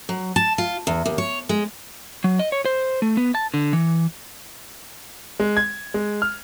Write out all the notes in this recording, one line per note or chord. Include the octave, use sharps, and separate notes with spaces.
F#3
A5
F4
E2
D#2
C#5
G#3
F#3
D#5
C#5
C5
A3
B3
A5
D3
E3
G#3
G#6
G#3
F6